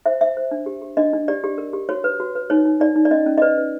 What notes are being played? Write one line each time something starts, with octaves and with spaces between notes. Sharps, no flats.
C5 E5
C5 E5
C5
D4
G4
G4
D4 D#5
D4
G4 D5
G4
A#4
G4
F#4 C#5
B4
F#4
B4
D#4 C#5
D#4
D#4 D5
D#4
D5
C#4 D#5
C#4
D#5
B4 D5
B4